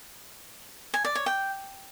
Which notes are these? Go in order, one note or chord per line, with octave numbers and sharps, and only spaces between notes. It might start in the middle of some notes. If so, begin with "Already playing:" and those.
G#5
D5
C#5
G5